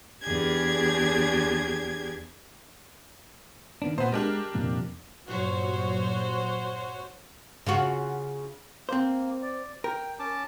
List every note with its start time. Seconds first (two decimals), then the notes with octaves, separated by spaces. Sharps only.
0.21 E2 D4 G4 G#4 G#6
3.82 D#3 B3 D4
3.98 A#2 B3 C5
4.12 G#3 D4 G4 A#4
4.55 C2 F2 A#2
5.27 G2 A#2 F#3 F#4 C5 C#5
7.66 C#3 F4 F#4
8.89 A#3 C4 C5
9.42 D5
9.84 A#4 G5
10.19 C#4 A5 D6